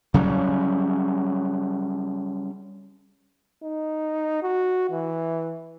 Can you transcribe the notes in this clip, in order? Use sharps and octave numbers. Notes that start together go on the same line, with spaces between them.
C#3 F#3 G3
D#4
F#4
E3